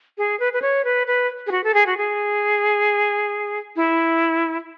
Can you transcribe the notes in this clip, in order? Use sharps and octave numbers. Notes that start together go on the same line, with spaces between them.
G#4
B4
B4
C#5
B4
B4
G#4
F#4
A4
G#4
F#4
G#4
E4